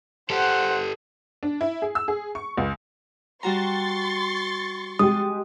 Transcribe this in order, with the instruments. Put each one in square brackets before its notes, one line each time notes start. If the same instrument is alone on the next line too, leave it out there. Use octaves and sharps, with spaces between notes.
[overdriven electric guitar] G4 A4 [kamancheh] C5 F#5
[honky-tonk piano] D4
E4
G#4
E6
G#4
C#6
C#2
[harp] G3 F#4 A#5 [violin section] C6 C#6 A6
[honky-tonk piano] G#3 G4 [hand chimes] D#6